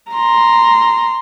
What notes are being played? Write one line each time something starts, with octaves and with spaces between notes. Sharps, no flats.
A#5 C6